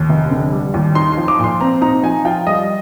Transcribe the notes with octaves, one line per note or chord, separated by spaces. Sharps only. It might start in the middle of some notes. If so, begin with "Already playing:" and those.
Already playing: D#2
F1
D3
G3
D#2
D#4 C6
F3 C6
D6
A#2 C6
C4 A#5
D#4 A#5
F3 G#5
F4 G5
G3 D#5